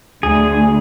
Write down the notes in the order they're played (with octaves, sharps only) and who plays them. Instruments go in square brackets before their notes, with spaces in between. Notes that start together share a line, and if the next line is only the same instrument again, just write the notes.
[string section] D2 [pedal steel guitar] G#4